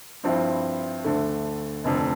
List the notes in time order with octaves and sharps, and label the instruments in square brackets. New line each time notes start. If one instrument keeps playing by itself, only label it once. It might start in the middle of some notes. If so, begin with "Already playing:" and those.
[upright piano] G2 F3 C4 E4
D2 D3 A3
F1 F2 D3